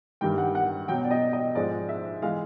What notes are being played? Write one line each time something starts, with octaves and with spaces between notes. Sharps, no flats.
G2 D#3 G3 G5
F#5
F#5
B2 F#3 G5
D5
D#5
D#5
G#2 F3 G#3 D5
E5
E3 G#3 F5